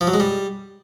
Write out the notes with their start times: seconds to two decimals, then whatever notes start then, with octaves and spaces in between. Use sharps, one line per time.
0.01 F3
0.07 F#3
0.14 G#3
0.20 G3